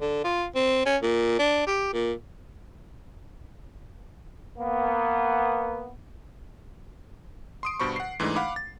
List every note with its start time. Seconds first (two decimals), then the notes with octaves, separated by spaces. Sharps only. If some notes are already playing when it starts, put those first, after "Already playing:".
0.01 D3
0.24 F4
0.55 C4
0.86 C#4
1.02 A#2
1.39 D4
1.67 G4
1.93 A#2
4.58 A#3 B3
7.63 C6 D#6 D7
7.79 G2 B2 C5 B5 C#6
7.96 F#5 C7
8.20 G#2 E3 A3 D4 D#4
8.36 F5 F#5 B5 D6
8.56 A6